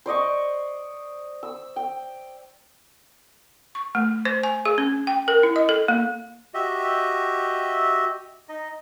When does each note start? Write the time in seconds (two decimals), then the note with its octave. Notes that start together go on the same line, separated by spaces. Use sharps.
0.06 C5 D5 D#5 C#6
1.43 E6
1.76 G5
3.75 C#6
3.95 A3
4.25 C5
4.43 G#5
4.66 G#4
4.78 C#4
5.07 G5
5.28 A#4
5.43 E4
5.56 D#5
5.69 A4
5.88 A#3
6.54 F#4 G4 D#5 E5
8.49 D#4 D#5